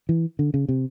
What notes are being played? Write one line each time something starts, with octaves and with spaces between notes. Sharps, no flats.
E3
D3
C#3
C3